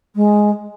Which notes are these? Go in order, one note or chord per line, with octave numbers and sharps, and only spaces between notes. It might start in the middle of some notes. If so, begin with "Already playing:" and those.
G#3